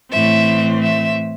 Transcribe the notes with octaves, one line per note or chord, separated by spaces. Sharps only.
A2 E3 C4 E5
E5